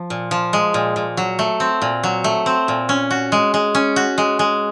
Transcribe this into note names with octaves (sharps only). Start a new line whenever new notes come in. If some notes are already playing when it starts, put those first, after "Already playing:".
Already playing: F3
A#2
F3
G#3
A#2
A#2
F#3
A3
C4
A#2
F#3
A3
C4
A#2
C#4
F#4
G#3
G#3
C#4
F#4
G#3
G#3